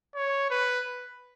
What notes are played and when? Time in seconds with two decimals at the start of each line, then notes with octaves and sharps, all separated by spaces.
0.15 C#5
0.50 B4